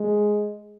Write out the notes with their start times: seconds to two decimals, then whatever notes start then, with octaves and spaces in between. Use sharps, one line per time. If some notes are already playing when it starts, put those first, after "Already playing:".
Already playing: G#3